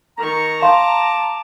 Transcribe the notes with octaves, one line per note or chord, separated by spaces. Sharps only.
D#3 A#5 C#6
F5 A5 C6 D6